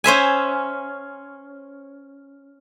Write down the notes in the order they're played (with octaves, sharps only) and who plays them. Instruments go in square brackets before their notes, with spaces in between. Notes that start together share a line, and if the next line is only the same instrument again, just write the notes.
[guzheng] C#4 C5 E5 G#5